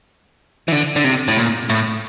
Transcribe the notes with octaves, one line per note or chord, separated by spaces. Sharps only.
E3
D3
D3
C3
A2
A#2
A2